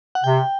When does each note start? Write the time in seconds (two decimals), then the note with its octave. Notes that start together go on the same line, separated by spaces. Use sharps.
0.15 F#5
0.24 C3 G5